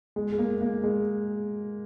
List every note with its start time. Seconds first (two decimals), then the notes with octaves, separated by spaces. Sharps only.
0.16 G#3
0.32 G#3
0.38 A#3
0.61 A#3
0.84 G#3